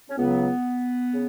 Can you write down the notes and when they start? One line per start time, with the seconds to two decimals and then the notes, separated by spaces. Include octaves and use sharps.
0.10 C#4
0.17 C#2 C#3 F#3 B3
1.14 C#3